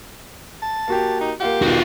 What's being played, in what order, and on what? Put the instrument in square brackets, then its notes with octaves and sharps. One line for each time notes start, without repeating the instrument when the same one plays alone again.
[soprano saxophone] A5
[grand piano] A#3 F#4 G4
[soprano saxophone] D#4
[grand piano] A#3 F4 F#5 [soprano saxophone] G4
[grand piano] E1 D#3 B3 [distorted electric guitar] F4 F#4